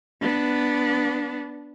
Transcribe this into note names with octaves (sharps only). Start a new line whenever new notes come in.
B3 D4